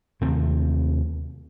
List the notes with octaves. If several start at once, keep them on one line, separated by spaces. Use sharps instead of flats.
D#2 C3 A3 C4